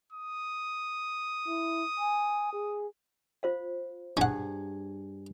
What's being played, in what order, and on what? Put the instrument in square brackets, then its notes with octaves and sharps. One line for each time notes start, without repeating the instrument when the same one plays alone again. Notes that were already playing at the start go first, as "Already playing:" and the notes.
[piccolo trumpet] D#6
[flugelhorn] E4
G#5
G#4
[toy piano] F4 C5 F5
[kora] G2 G#4 [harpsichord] C#4 F#5